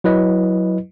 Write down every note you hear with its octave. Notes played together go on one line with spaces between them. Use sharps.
F#3 E4 B4 D#5